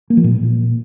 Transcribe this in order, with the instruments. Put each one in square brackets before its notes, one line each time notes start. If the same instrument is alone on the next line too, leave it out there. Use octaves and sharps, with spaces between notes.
[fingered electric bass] A#3
F3
A#2